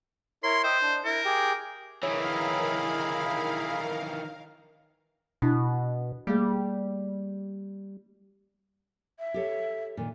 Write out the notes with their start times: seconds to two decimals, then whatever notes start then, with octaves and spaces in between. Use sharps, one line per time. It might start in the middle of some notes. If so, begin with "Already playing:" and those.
0.43 E4 A#4 C#5 C6
0.64 C5 D#5 E5 G5
0.82 D4
1.05 E4 A#4
1.25 G4 G#4 G5
2.03 D#3 E3 E4 G#4 A#4 C#5 F5 B5
5.42 B2 D4 E4
6.27 G3 A3 A#3 G#4
9.20 E5
9.34 G4 A4 C#5
9.97 A#2 D#3